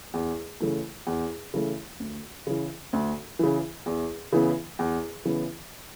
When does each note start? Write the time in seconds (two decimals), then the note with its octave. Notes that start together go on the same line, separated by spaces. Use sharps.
0.14 E2
0.60 C#3 E3 A3
1.07 E2
1.54 C#3 E3 A3
2.00 D2
2.47 C#3 E3
2.93 D2
3.39 C#3 E3
3.86 E2
4.32 C#3 E3 B3
4.79 E2
5.25 C#3 E3 B3